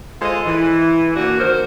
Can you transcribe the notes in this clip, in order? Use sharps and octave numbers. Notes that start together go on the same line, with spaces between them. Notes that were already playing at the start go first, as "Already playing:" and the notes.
G#3 F4 A4 C5 D#5
E3
A#3 D4 F#4
G2 D#3 A#4 C5